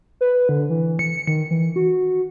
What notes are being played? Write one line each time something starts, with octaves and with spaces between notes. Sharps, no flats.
B4
D3
E3
C#7
D#3
E3
F#4